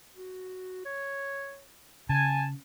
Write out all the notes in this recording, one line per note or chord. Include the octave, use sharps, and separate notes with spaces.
F#4
C#5
C#3 G#5 A5